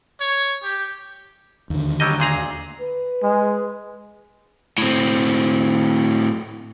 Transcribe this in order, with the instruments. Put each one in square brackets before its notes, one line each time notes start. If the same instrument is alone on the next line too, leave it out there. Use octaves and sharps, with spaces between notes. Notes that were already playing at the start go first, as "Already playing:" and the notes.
[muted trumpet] C#5
G4
[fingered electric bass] D#2 D3
[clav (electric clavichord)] F#3 G3 D#5
A#2 G#4 A#5
[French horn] B4
[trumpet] G#3
[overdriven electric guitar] A2 C4